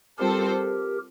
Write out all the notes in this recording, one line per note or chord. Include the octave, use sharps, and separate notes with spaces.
G3 C4 F4 G4 A4 A#4 C5